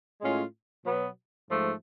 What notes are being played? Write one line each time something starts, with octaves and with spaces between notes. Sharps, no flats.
A2 G#3 C#4 F4
B2 F#3 B3
G#2 F3 A3